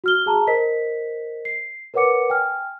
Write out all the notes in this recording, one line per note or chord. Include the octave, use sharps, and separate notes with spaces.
F#4 F6 G7
G#4 A5 A#5
A#4 C5 D#5 B6
C7
A#4 B4 C#5 F#5 D6 C#7
G5 G#5 F6